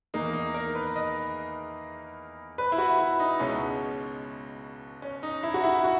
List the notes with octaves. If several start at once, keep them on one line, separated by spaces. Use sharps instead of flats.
E2 D#3 A#3 D#4
D#4
A#4
B4
D#5
B4
E4
F#4
E4
D#4
C#2 B2 G#3 C#4
C#4
D#4
E4
F#4
E4
F#4